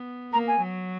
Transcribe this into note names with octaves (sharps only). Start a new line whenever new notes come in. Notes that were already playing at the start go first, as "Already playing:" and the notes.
Already playing: B3
A#3 A#5
G#5
F#3